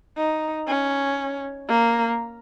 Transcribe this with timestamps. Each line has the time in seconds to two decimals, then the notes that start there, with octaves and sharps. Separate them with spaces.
0.17 D#4
0.68 C#4
1.68 A#3